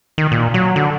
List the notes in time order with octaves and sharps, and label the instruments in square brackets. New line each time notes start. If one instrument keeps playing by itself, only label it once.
[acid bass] D#3
A#2
F#3
D3